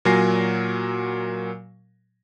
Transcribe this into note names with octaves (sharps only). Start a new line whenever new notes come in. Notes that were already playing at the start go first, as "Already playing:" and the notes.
A#2 F#3 A#4 G#5 A#6 C7